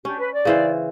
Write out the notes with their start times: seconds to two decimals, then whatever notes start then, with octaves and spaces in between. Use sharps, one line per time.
0.05 C#4 D4 G4
0.19 B4
0.32 D5
0.45 C#3 E3 C5